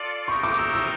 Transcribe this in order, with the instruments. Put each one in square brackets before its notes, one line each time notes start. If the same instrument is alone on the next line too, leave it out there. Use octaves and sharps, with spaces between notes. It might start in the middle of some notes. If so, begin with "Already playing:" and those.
Already playing: [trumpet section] F4 A4 D5
[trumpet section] A3 C4 D#4 G4 A#4 [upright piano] C#6
[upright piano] D6
E6
E6